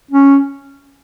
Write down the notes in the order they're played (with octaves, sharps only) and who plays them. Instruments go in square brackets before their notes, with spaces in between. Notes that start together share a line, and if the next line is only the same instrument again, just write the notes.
[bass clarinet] C#4